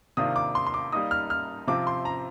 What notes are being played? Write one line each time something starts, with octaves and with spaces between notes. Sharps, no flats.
C3 D#3 A#3 D4 F4 D#6
D6
C6
C6
D6
G3 A#3 D#4 D#6
F6
F6
C3 F3 C4 F4 D6
C6
A#5